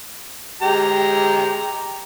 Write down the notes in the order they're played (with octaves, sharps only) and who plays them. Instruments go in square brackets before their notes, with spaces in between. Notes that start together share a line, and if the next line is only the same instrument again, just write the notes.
[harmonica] G#3 G4 A#5